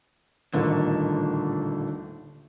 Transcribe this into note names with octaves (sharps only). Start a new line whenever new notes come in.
D#1 A1 D3 D#3